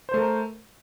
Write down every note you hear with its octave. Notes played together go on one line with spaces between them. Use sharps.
A3 A#4 C5